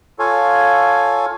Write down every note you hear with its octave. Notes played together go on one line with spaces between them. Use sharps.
F4 A4 C#5 F5 G#5